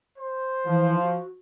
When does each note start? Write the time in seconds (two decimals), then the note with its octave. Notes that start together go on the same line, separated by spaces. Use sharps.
0.18 C5
0.66 E3 F3
1.02 F#4